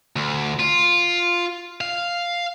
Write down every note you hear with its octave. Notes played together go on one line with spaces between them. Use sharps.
D2
F4
F5